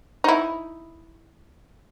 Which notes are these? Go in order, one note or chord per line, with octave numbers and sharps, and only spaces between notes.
D#4 E4